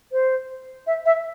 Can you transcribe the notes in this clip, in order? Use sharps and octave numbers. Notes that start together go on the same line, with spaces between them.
C5
E5
E5